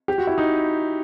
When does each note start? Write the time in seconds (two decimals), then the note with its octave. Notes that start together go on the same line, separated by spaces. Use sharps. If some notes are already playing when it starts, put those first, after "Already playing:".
0.08 G4
0.18 F#4
0.27 E4
0.38 D#4